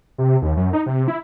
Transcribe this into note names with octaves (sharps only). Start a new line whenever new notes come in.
C3
D#2
F#2
D#4
C3
E4